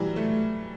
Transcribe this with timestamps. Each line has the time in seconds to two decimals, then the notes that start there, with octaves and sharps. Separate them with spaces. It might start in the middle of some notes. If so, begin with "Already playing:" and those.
Already playing: E3 F#3 G3
0.16 A3